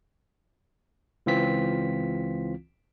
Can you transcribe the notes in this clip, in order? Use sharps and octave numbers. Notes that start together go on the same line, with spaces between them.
C#2 E3 C4 F4 B6